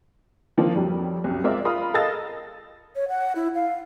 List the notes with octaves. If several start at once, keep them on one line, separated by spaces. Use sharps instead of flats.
D#3 F3 A#3 C4 D4
F2 F#3 G3
C2 F#2
G#3 C4 F4 A#4 D5 E5
F4 A#4 B5 D#6
A4 A#4 D#5 F5 E6 A6
C#5
F#5
E4
F5